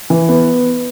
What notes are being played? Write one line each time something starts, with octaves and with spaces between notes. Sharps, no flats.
E3
B3